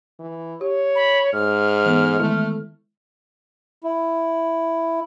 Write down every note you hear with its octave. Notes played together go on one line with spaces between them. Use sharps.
E3
G4 C#5
B5
G#2 F6
E3 B3 A4
D#3 G#3 A3 E4
E4